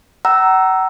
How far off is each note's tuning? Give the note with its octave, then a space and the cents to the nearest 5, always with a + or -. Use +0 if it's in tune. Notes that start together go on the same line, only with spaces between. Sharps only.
F#5 +40 A#5 +0 E6 +0